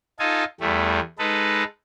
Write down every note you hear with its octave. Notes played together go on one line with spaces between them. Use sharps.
D#4 F4 A4 G#5
E2 G3 A3
G#3 D#4 A4 B4